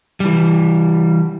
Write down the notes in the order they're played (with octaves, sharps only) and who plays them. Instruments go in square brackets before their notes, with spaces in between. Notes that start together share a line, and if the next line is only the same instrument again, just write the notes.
[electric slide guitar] E3 G3